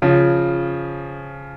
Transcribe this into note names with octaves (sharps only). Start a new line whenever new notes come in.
C#3 F3